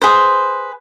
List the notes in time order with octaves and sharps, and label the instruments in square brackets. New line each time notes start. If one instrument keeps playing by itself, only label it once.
[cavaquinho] G#4 B4 C5